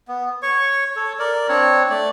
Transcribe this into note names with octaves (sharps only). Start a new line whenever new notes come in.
B3
C#5 C#6
A4 C#5
A#4 D5
C4 D4 C#5
A3 D5